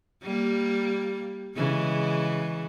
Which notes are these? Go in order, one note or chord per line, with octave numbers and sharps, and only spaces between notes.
G3 A#3
C#3 E3 G#3